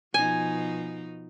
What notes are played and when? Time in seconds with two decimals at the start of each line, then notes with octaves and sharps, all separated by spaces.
0.14 B2 F3 D#4 G#5